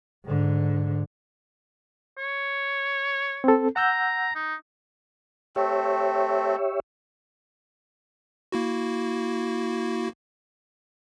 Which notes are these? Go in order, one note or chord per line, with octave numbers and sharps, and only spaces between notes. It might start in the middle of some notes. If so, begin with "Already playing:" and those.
G#2 D3
C#5
C4 A4
F#5 A#5 E6 G6
D#4
A3 C4 G4 C#5 E5
A#3 E4 F#4